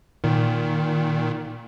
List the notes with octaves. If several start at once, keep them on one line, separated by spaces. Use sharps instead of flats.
A#2 D#3